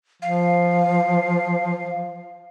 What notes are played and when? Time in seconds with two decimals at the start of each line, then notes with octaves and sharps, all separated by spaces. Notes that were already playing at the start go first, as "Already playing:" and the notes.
0.22 F3 F5